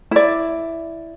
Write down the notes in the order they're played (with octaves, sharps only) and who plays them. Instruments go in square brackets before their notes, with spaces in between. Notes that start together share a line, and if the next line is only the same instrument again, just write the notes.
[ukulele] E4 D5